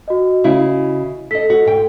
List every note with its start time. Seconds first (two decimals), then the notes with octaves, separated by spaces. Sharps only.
0.08 F#4 D#5
0.44 C#3 E4
1.31 A4 D#5 B6
1.50 F#4
1.65 G#2 G5